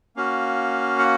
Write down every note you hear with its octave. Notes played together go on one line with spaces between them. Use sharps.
A#3 C#4 F#4 F5
F#5